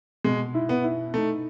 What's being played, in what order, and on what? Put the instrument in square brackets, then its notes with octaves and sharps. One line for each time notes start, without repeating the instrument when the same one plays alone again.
[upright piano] B2 [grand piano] G#3
[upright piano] E4
[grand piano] B3
[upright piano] E4
[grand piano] A3 [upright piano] D#4